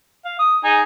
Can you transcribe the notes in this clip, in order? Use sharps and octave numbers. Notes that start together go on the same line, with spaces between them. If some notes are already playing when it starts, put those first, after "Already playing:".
F5
D#6
D#4 G#4 G#5